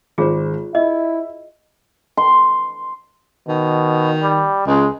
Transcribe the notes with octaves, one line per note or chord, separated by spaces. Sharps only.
G#1 F4 G#4 C5
E4 D#5 E5
C6
B2 D#3
G3
C#2 G#3